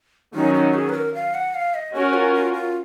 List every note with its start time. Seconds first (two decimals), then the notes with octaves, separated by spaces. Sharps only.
0.34 D#3 F#3 C#4 D#4
0.54 D#4
0.74 G#4
0.89 B4
0.95 A#4
1.15 F5
1.34 F#5
1.55 F5
1.75 D#5
1.94 C#4 F#4 A#4 C#5
2.14 F4
2.34 F4
2.53 F4